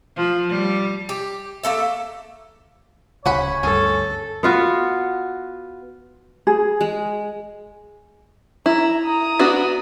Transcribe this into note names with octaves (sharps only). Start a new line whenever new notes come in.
F3
G3
G4
A3 A#3 A4 E5
D1 C#3 C#4 C#5 F#5 B5
D2 G2 C#4 A4
B3 F4 F#4
G#4
G#3
E4 A#5
A#5 D#6
B3 D4 F#4